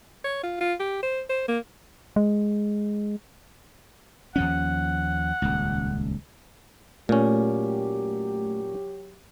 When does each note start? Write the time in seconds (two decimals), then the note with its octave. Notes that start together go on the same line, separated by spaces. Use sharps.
0.24 C#5
0.43 F4
0.61 F4
0.80 G4
1.03 C5
1.29 C5
1.48 A#3
2.16 G#3
4.36 D#2 F3 C#4 F#5
5.42 D#1 C#2
7.09 A#2 F#3 A3 C#4 G4